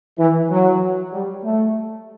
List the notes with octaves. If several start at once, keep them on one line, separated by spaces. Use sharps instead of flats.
E3
F#3
G3
A3